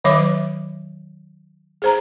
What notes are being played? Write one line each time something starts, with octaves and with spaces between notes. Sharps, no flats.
D#3 F#3 C#5 E5 D6
G#4 C5 A#5